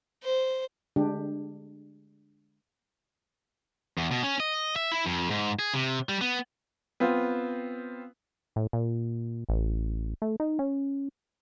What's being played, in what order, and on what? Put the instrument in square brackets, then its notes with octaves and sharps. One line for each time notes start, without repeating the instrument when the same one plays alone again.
[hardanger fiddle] C5
[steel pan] D3 G#3 D4 G4
[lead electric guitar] E2
B2
C#4
D#5
E5
E4
F2
G#2
G#4
C3
G3
B3
[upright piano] B3 C4 F4
[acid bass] A2
A#2
A1
A3
D#4
C#4